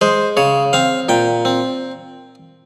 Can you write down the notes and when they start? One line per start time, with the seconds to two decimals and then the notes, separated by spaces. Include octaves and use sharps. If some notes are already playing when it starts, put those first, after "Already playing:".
0.01 G#3 C5
0.37 C#3 C#5
0.73 C4 F5
1.09 A#2 G5
1.45 C4